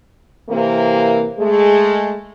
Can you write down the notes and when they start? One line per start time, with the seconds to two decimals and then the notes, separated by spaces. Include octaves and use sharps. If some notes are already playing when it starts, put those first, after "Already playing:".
0.50 C3 E3 A#3
1.39 G#3 A3 G#4